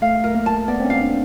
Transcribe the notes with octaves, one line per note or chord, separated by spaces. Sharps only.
A3 F5
A#4
A#3
A5
B3 D5
C4
C#4
F5
D4